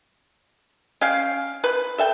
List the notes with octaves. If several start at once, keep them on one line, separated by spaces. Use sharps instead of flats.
C#4 F5 G5
B4
A4 E5 G5